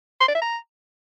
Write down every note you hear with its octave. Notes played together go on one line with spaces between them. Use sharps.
C6
D5
E5
A#5